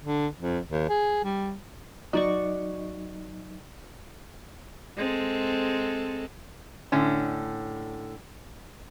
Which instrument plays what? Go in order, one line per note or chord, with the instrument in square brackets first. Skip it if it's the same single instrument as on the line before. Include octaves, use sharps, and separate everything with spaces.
[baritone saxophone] D3
F2
D#2
G#4
G3
[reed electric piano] F#3 D#4 D#5 [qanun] F#4 D5 C#6
[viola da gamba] G#3 C4 A4
[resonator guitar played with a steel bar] A2 D3 C#4